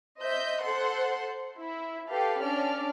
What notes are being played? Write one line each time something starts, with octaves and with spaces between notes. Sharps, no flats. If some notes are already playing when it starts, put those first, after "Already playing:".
C5 D#5 E5 G6
A4 C5 F#5 C6
E4
G4 A4 B4 F5
C#4 D4 D5 F6